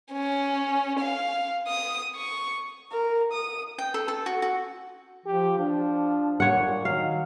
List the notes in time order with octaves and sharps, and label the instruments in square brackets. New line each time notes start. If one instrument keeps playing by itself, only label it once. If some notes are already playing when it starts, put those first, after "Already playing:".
[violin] C#4
F5
D#6
C#6
[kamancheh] A#4
D#6
[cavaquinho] G5
A4
A4
F#4
F#4
[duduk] F3 [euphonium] G4
[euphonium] F3 [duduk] D4
[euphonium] A#2 [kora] C#5 F#5
[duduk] D#3 [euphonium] F#3 [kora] F5